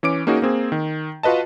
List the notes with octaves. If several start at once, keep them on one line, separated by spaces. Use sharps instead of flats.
E3 C#4 D6 D7
A#3 C#4 D#4 F#4 G#4
A#3 C4 G#4
D#3
F4 F#4 B4 D#5 A5